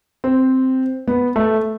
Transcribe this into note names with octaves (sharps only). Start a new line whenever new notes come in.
C4
B3
A3